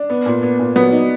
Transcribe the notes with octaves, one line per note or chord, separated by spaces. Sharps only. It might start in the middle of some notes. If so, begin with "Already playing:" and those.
Already playing: D4
B3
A#2
B3
A#2
F#3 B3
D#4